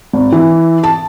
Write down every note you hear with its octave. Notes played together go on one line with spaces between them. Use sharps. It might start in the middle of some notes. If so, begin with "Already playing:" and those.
G#1
E3
A5